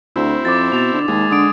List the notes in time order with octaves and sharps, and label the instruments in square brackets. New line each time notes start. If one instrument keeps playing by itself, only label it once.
[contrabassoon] D2 [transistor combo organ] C4 E4
[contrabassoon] F2 [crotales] D6 A6
[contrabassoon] B2 [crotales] A6 F7
[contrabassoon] D3
[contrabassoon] D#2 [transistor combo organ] G#3
[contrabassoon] D3 [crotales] D#6 D7